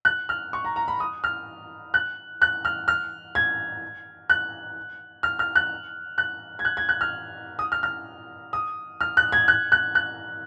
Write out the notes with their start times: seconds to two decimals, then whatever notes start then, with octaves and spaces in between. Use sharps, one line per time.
0.05 F#6
0.29 F6
0.53 C#6
0.65 A#5
0.76 A#5
0.88 B5
1.00 D#6
1.24 F6
1.94 F#6
2.42 F#6
2.65 F6
2.88 F6
3.35 G#6
4.30 F#6
5.23 F6
5.39 F6
5.55 F#6
6.18 F#6
6.59 G#6
6.65 F#6
6.77 G#6
6.89 F#6
7.01 F6
7.59 D#6
7.72 F6
7.83 F6
8.53 D#6
9.01 F6
9.17 F#6
9.32 G#6
9.48 F#6
9.72 F#6
9.95 F#6